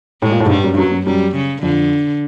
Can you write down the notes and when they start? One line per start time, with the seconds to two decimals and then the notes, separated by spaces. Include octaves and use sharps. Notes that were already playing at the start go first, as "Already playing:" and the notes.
0.22 A2 G#3
0.32 A#2
0.40 A2
0.46 G#2
0.50 G2 G3
0.64 F#2
0.74 G2
0.78 F#2 F#3
0.92 F#2
1.07 F#2 G3
1.35 C#3
1.62 F2 D3